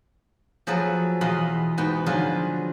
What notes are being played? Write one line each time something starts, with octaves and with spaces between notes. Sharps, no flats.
F3 F#3 G#4 A4 B4
E2 B2 F4 B4 D#5 B5
G#2 B3 B4 G5
D3 F3 F#3 F4 G#4 B4